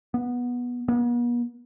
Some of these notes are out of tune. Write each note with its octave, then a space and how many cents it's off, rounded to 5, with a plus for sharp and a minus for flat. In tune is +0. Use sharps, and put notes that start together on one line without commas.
B3 -15
B3 -45